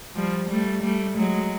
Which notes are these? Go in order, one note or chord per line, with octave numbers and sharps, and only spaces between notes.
F3 G3
G3 A3
G3 A3
F#3 G#3